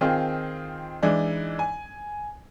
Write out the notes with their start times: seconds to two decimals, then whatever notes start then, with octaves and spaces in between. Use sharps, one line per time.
0.01 D#3 C4 F4 G#4
1.02 E3 G#3 D4 D#4
1.59 G#5